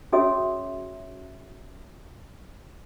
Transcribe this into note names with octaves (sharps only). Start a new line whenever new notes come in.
C#4 F#4 G#4 C#5 E5 D#6